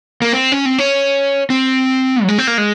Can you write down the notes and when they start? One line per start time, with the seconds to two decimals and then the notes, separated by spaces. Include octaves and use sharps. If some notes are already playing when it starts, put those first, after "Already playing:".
0.22 A#3
0.32 C4
0.52 C#4
0.65 C4
0.78 C#4
1.50 C4
2.23 F#3
2.28 G#3
2.38 C4
2.47 A#3
2.58 G#3